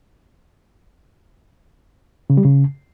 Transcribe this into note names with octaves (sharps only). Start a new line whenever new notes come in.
C#3
G3
C#3